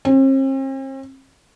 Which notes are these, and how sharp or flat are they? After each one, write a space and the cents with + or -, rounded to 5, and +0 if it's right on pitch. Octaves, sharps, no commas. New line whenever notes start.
C4 +45